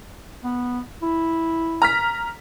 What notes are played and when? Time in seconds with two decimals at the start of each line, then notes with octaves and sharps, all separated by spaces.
0.44 B3
1.02 E4
1.82 A#5 F6 B6